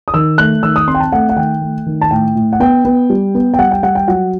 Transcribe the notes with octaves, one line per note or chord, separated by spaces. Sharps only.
D#6
D#3 E6
A3 F#6
D#3 E6
D#6
C4 C6
G5
A5
A3 F#5
F#5
D#3 G5
A3
D#3
A5
A2 G5
A2
F#5
B3 G5
B3
G3
B3
G5
G3 F#5
G5
G3 F#5
G5
F#3 F#5